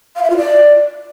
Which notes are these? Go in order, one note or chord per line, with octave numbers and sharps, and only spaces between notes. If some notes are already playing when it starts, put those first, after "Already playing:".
F5
E5
F4
D5